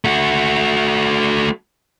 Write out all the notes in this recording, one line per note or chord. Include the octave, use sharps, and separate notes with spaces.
A3 F#4